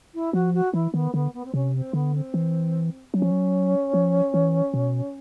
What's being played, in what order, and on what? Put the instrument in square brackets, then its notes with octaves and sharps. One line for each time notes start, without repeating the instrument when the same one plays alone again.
[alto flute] E4
[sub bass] F3 [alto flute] F#4
[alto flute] F#4
[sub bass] E3 [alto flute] E4
[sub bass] D#3 [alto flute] B3
[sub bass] D3 [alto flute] B3
[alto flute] B3
C4
[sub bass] C3 [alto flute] C#4
[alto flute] C4
[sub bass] D3 [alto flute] B3
[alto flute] C4
[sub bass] E3
[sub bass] F#3 [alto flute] C#4
[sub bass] F3
F#3
F3
E3
B2